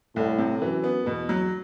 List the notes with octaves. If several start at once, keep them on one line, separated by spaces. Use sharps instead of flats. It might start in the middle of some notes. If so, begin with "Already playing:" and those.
C2 A2
C3
F#2 E3
B3
E2 B2
F#3